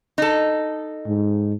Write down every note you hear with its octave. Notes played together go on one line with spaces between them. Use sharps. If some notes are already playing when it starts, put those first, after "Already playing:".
D#4 A4
G#2